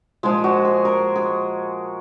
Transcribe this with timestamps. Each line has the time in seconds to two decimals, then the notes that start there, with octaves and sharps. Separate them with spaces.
0.23 A#2 F3 G#3 F4
0.44 F#4
0.65 G#4
0.85 A#4
1.16 G#4